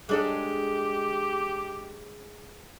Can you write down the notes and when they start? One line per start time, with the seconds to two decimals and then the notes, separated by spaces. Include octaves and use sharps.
0.09 G#3 D4 G4 A4